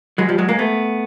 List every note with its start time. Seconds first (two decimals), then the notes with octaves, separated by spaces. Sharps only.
0.18 F#3 G#3
0.29 F3 G3
0.38 F#3 G#3
0.49 G#3 A#3
0.59 A3 B3